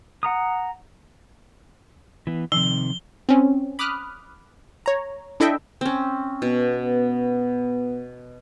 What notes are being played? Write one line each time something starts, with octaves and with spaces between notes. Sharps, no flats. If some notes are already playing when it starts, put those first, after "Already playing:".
F#5 A#5 D#6
E3 B3
C3 D#3 F3 G7
C4 C#4
B5 D6 D#6 F6 F#6
C#5 A#5
D4 E4 A4 D#5 E5 G5
C4 C#4
B2 B3